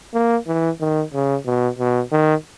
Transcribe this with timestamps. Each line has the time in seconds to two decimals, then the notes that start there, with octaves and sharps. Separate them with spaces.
0.14 A#3
0.47 E3
0.81 D#3
1.14 C#3
1.46 B2
1.79 B2
2.12 D#3